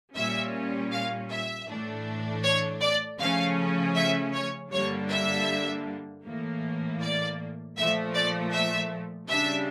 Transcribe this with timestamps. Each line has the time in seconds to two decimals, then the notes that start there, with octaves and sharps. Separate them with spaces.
0.14 A#2 G3 C#4 E5
0.91 F5
1.29 E5
1.67 A2 E3 A3 D4
2.43 C#5
2.81 D5
3.19 C#3 F3 A3 C#4 F5
3.95 E5
4.33 C#5
4.71 G2 D3 G3 A#3 D4 C#5
5.09 E5
6.24 A2 E3 A#3
7.01 D5
7.76 A#2 F3 A3 E5
8.14 D5
8.53 E5
9.28 C#3 G3 D4 E5